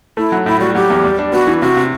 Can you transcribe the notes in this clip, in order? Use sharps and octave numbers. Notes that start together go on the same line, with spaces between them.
A3 E4
F#3
A2 E4
G3 F#4
F#3 G4
E2
G3
D4
B3 F#4
E3
C3 F#4
C3